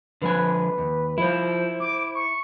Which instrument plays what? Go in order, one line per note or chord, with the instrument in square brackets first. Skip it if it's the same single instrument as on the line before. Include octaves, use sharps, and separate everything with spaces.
[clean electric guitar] D3 F3 G#5 [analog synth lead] B4
[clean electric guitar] D#2
[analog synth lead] F3 [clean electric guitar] E4 C5
[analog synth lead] D6
C#6